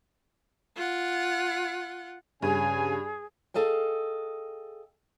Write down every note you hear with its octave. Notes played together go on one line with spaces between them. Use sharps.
F4 F#5
G2 C#3 G#4 G#5
G#4 A4 D#5 F5 G5